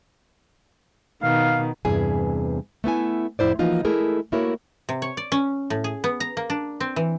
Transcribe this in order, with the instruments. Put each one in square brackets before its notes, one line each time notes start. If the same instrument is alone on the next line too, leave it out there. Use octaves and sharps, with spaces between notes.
[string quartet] B2 D#3 [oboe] F5
[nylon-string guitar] E2 G2 C3 E4 G#4 G#5
A3 B3 E4 G#5
F2 A2 E4 C5 D5
E3 F3 A#3 D#4 F4 F#4
G#3 A3 E4 G#4 A#4
A3 A#3 E4 F#4 A#4 C#5
[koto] C3
C#5
D5
C#4
A2
G#4
B3
A#5
A#3
D4
C4
E3